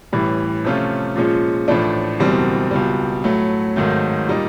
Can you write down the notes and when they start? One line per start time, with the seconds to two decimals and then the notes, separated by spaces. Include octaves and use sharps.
0.13 A1 A2 E3 G3
0.65 C3 F3 A3 C#4 F4
1.16 A#2 F3 G#3 C#4
1.68 A1 A2 F3 A3 D4
2.19 F#1 E2 B2 G3 C4
2.71 C#2 B2 G3
3.24 A2 F#3 A3
3.76 G#1 G#2 D#3 F#3 A3
4.27 A#2 G3 A#3 D#4